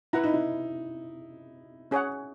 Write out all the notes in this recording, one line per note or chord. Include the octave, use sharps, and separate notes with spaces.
E4 B4 F#5 A#5
D#4
E4
C#4 G#4 C#5 F#5